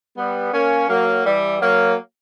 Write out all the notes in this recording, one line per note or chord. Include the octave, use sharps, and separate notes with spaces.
G3 B3
A#3 C#4
F#3 A#3
E3 G3
F#3 A#3